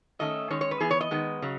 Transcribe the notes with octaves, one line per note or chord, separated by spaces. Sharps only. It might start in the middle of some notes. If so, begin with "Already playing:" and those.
D#3 A3 C#4 D#5
D#3 G#3 C#4 C#5
C#5
B4
E3 B3 G#4
C#5
D#5
D#3 G#3 B3
C#3 F#3